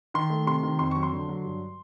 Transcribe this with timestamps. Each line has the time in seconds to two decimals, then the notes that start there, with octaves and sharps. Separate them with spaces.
0.14 D#3 C6
0.30 A3
0.46 C3 C6
0.63 D#3
0.79 F2 C6
0.91 F#3 C#6
1.03 C6
1.12 D3
1.29 F#3
1.45 G2